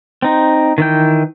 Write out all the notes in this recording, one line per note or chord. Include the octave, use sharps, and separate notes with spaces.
C4 D#4
D#3 E3 G5